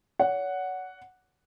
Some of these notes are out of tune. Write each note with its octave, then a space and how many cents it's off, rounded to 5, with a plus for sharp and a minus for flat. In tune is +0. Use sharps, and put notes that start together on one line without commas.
C#5 +40 F#5 +0